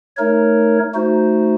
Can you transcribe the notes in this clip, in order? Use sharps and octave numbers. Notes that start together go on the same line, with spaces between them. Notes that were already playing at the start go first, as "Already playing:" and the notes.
A3 D#4 A#4 C#5
A3 D#4 F#4 C5